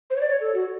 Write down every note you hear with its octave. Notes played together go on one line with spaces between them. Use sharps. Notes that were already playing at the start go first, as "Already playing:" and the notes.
C5
C#5
D5
C#5
A4
F#4